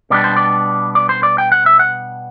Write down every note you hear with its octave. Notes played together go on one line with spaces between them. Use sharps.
B2 G3 B3 D4 D5
C5
D5
D5
C5
D5
G5
F#5
E5
F#5